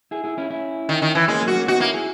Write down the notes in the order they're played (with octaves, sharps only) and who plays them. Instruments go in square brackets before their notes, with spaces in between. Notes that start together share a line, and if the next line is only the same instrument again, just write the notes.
[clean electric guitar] E4 G#4
E4 G#4
C#4 E4
C#4 E4
[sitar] D#3
D#3
E3
[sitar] G#3 [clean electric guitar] A#3 C#4
[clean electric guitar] F#3 A#3
[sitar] F#4
[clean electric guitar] A#3 C#4
[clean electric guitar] B3 D#4 [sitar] F#4
[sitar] A#3 [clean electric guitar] C#4 E4
[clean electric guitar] E4 G#4